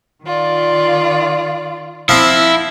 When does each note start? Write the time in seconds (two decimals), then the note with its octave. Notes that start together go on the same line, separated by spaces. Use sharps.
0.25 D#3 F4 D5
2.09 F3 C4 E4